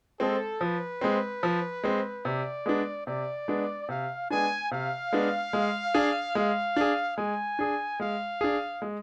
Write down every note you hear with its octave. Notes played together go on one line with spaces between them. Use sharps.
G#3 C4 A4
F3 B4
G#3 C4
F3
G#3 C4
C3 D5
G#3 B3 D4
C3 D5
G#3 B3 D4
C3 F5
G#3 B3 D4 G#5
C3 F5
G#3 B3 D4
G#3
D4 G#4
G#3 F5
D4 G#4
G#3 G#5
D4 G#4
G#3 F5
D4 G#4
G#3